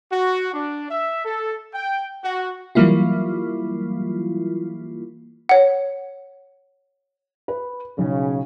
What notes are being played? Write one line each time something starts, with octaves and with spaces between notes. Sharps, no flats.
F#4
D4
E5
A4
G5
F#4
E3 F#3 G3 A#3 E4 F4
C#5 F#5
B4
B1 C#3